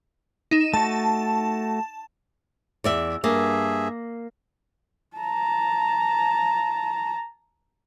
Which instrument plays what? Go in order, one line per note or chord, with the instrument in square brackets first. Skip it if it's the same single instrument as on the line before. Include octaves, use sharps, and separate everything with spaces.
[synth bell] D#4 E7
[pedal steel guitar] A3 F#4 [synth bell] A5
[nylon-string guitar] E2 D5 E5
[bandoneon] G2 G#4 E5 [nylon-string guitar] A#3
[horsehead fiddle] A5 A#5